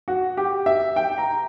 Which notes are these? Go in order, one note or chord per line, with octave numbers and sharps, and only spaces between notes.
F#4
G4
E5
G5
A#5